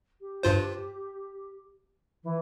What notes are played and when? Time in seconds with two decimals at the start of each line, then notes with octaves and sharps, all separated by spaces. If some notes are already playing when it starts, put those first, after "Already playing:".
0.21 G4
0.43 G2 F4 C5
2.23 E3